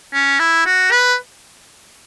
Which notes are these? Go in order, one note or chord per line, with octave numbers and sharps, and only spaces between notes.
C#4
E4
F#4
B4